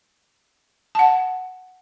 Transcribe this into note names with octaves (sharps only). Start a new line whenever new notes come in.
F#5 A5